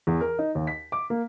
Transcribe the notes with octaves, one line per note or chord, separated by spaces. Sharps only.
E2
A#4
D#4
D#2
B6
D6
A#3